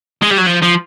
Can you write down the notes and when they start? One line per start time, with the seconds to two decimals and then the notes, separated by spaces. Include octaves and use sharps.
0.22 G#3
0.30 G3
0.38 F#3
0.46 F3
0.62 F3